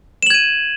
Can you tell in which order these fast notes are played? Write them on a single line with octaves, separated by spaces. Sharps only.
E7 F#7 G#6 D#7